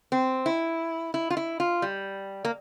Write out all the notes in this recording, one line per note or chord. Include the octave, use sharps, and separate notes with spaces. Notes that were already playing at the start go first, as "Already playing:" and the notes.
C4
E4
E4
F4
E4
F4
G3
A#3